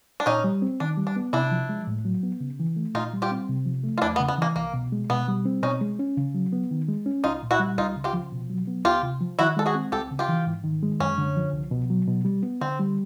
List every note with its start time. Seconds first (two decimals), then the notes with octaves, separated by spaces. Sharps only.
0.20 D4
0.26 A#2 C#4 D#4
0.44 G3
0.62 C4
0.80 D#3 D4
0.97 G3
1.07 D4
1.16 B3
1.33 C3 D4 E4
1.52 F3
1.69 G#3
1.87 A2
2.05 F#3
2.23 B3
2.41 C#3
2.60 E3
2.76 A3
2.94 A#2 D#4 F4
3.13 G3
3.22 F4 G4
3.31 C4
3.49 C3
3.66 F3
3.84 A3
3.98 F4
4.02 E2 D4 E4
4.16 B3
4.20 C#3
4.28 B3
4.38 E3 A#3
4.56 C2 A#3
4.74 B2
4.92 G#3
5.10 B2 B3
5.28 G3
5.46 C4
5.63 B2 C#4 D#4
5.81 G#3
5.99 C#4
6.17 C#3
6.35 F#3
6.53 B3
6.71 D#3
6.89 G#3
7.06 C#4
7.24 C2 D#4 F4
7.43 A#2
7.51 E4 F#4
7.59 G3
7.78 C#2 D#4 F4
7.96 C#3
8.04 F4 G4
8.13 F3
8.32 B2
8.50 F#3
8.67 B3
8.85 D2 F4 G4
9.03 C3
9.21 F3
9.39 D#3 E4 F#4
9.57 G#3 A4
9.66 F#4 G#4
9.75 C4
9.92 C#2 G4 A4
10.11 C#3
10.19 F4 G4
10.29 E3
10.47 G#2
10.64 D#3
10.83 G#3
11.00 F#2 C#4
11.18 D3
11.36 F3
11.53 C2
11.71 B2
11.90 F#3
12.08 B2
12.25 G3
12.43 B3
12.61 D3 C4
12.80 G3